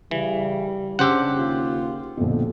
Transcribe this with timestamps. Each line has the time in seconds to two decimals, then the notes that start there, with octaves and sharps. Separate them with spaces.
0.11 C#3 E3 G3
0.99 C#3 D4 G4 C5 F#5 E6
1.35 D#2 F4
2.17 A#1 F2 B2 D3